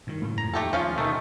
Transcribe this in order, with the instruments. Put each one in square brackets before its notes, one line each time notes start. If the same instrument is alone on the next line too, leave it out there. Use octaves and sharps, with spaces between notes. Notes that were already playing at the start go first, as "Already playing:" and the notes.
[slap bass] G2 D#3
[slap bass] F#1 F#2 A3 [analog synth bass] A2
[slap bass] F2 [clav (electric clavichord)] A#5
[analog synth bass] D#2 [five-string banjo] A3 G4 A4
[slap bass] E2 [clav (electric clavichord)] F3 [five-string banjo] C#4 F4 F5
[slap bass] B2 [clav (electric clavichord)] D#3 A3